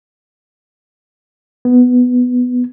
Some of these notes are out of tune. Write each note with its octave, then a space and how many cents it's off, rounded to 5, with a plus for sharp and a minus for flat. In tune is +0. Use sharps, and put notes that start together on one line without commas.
B3 +5